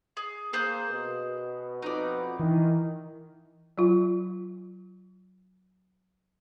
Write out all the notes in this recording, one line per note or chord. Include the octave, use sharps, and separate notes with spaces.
G#4
A#3 G#4 C5 F#6
B2
F2 B2 B3 D#4 D5
D#3 E3
F#3 F4